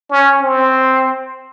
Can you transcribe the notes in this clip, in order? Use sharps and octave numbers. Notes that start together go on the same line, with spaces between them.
C#4
C4